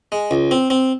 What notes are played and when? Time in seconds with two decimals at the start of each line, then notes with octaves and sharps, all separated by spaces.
0.12 G#3
0.31 C#2
0.51 C4
0.70 C4